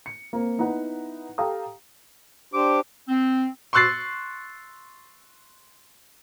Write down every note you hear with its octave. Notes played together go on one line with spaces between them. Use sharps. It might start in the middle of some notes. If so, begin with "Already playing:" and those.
C#7
A#3 C4
B3 D#4 E4 B4 F#5
G4 A4 F5 G5 A#5 D#6
D4 G4 C5 D6
C4
C6 C#6 E6 F#6 A6 C7